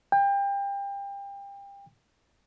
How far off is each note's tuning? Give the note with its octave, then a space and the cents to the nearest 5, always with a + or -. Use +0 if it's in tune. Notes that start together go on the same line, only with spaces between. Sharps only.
G5 +30